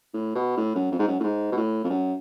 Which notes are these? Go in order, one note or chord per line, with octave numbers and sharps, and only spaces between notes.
A2
B2
A2
F#2
F2
G#2
F#2
A2
G#2
B2
A2
F2
F#2